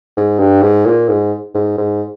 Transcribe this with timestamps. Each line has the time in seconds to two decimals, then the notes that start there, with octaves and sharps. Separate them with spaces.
0.17 G#2
0.39 G2
0.62 G#2
0.86 A#2
1.09 G#2
1.55 G#2
1.78 G#2